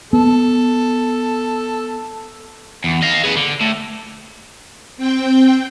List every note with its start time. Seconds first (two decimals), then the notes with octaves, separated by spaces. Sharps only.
0.13 B3 A4
2.84 E2
3.02 D#5 F5
3.24 G#4 B4
3.37 D3
3.61 A2
4.97 C4 G5